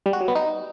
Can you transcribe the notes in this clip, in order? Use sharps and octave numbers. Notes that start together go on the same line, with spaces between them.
G3
F#4
F#3
B3
D#4